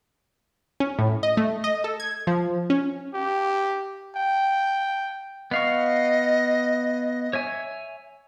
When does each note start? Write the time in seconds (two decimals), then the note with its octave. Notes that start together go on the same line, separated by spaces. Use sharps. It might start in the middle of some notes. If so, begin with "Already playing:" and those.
0.80 C#4
0.98 A2
1.23 D#5
1.37 A3
1.64 D#5
1.84 A4
2.00 G#6
2.27 F3
2.70 C#4
3.14 G4
4.16 G5
5.51 B3 D#5 F5 C#6
7.33 C#5 E5 G#5